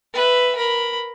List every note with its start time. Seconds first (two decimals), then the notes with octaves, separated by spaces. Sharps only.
0.14 B4 E5
0.56 A#4 B5